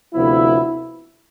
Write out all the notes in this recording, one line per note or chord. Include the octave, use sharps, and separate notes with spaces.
D2 C3 F3 B3 E4